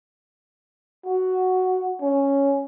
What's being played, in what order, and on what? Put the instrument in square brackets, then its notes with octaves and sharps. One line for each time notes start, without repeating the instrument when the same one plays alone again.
[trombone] F#4
C#4